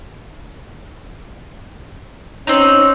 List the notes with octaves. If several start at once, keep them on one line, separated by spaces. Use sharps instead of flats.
C4 C#4 D#4